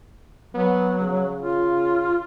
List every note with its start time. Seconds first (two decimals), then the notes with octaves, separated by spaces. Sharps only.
0.54 F#3 B3
1.00 C#3
1.42 F4